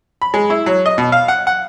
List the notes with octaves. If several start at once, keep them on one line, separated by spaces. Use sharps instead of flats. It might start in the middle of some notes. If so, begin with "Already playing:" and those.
B5
G#3
E4
F#3
D#5
B2
F5
F#5
F#5